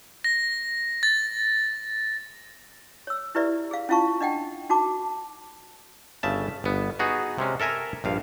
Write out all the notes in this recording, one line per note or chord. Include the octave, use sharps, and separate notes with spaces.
A#6
A6
C#5 E6
E4 G4 B4 D5 E5
G#4 F5
C#4 E4 F4 F5 A5 C#6
D4 D#5 F#5 G5
D#4 F#4 A5 D6
G1 C#3 E5 A5
G1 B3
B3 D#4 F#4 G#4
C3 G#3 C#4
A4 A#4 E5 G#5 A#5
A#1 G2 F5